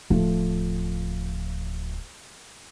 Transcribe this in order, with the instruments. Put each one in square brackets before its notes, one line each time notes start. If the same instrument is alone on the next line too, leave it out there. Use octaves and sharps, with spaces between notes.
[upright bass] D1 [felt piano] F3 A3